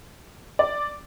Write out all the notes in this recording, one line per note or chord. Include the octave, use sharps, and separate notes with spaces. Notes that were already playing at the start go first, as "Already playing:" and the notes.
D5